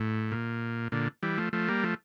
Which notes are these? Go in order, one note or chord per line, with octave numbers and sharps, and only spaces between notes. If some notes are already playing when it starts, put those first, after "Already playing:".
Already playing: A2
A#2
A#2 D3
E3 G3
F3 A3
F3 A3
G3 A#3
F3 A3